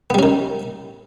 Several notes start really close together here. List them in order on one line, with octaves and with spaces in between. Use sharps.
B3 G3 C#4 D#3